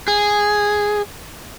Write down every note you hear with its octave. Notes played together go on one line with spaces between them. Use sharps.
G#4